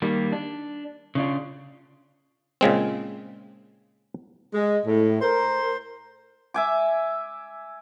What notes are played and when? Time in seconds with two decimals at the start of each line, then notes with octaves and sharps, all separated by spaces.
0.02 D#3 G3 A#3
0.32 D4
1.15 C#3 D4 F4
2.61 A#2 C#3 G#3 C4
4.54 G#3
4.86 A2
5.22 A#4 C5
6.54 E5 G#5 D6